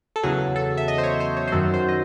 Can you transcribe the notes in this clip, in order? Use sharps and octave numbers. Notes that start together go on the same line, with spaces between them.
A4
E2 C#3 F#3 G#4
A4
E5
D#5
C5
C#5
C5
C#5
C5
F#2 D#3 F#3 A4
C5
D#5